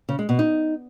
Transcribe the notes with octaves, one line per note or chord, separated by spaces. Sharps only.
C#3
G#3
B2
D#4